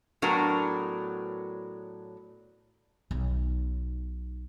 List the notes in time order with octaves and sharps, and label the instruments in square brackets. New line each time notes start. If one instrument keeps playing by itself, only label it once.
[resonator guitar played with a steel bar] A2 F#3 B3 D4 F#4 A#4
[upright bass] B1 D#4